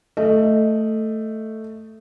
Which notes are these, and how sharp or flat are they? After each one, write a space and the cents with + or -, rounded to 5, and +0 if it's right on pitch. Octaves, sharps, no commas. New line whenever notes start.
A3 +5 D#5 +0